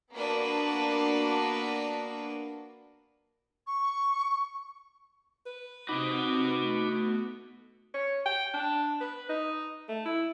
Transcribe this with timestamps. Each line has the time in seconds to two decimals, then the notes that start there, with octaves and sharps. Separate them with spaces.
0.15 A#3 B3 D4 F#4 B4
3.67 C#6
5.46 B4
5.89 C3 C4 D#4 F#4 D#5 B5 D6
6.56 A3 B3
7.94 C#5
8.26 G5
8.54 D4
9.01 B4
9.29 D#4
9.89 A3
10.05 E4